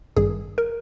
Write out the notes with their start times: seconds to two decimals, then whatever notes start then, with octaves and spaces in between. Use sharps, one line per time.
0.16 G#1 G2 D#3 G3 G#4
0.58 A#4